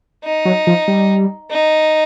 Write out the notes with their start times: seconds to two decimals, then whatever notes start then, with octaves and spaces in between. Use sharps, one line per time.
0.24 D#4
0.45 F#3
0.67 F3
0.88 G3
1.51 D#4